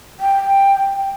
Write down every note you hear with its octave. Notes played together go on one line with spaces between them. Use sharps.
G5